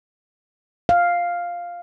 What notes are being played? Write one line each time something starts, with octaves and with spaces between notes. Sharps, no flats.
F5